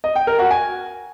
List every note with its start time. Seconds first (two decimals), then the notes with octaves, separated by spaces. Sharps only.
0.04 D#5
0.16 G5
0.27 A#4
0.39 F#4
0.51 G#5